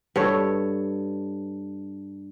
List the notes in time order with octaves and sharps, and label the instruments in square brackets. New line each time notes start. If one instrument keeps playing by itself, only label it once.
[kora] G2 A4 C#5